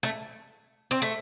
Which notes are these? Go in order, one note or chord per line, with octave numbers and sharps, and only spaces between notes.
A3
C4
A3